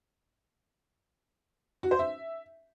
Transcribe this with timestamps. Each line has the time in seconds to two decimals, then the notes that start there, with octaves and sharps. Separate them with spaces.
1.83 F#4
1.91 C5
1.99 E5